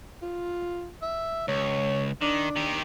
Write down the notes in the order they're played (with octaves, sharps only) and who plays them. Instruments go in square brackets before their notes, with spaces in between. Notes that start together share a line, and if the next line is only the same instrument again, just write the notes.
[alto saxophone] F4
E5
[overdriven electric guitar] C#2 [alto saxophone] C#5
[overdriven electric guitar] D#3 [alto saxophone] D4
[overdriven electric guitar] D#3 G4